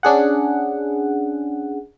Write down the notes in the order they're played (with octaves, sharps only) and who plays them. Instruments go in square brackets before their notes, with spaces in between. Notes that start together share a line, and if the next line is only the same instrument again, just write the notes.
[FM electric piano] C#4 D4 G#4 F#5